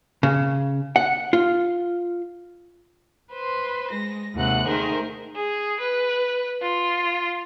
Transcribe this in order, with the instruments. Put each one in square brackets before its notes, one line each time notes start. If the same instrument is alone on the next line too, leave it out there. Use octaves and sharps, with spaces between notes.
[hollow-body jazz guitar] C#3
F#5
F4
[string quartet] B4 C5 C6
G#3 A#6
D#2 C3 G#3 F#5 F#6
D#3 A3 G#4 A#4 C5
[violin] G#4
B4
F4